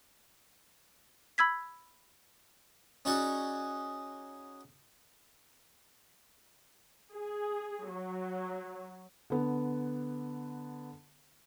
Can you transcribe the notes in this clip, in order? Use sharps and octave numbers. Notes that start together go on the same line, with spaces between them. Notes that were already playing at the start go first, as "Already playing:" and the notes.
B5 E6 G#6 B6
C#4 D#4 F#4 G#4 D5 F#5
G#4
F#3
D3 B3